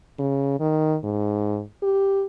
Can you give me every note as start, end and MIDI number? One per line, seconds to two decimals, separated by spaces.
0.19 0.56 49
0.60 0.97 51
1.04 1.62 44
1.83 2.26 67